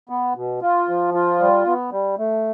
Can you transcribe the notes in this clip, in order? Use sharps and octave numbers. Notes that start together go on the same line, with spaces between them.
B3
B2
F4
F3
F4
G3
B3
G3
A3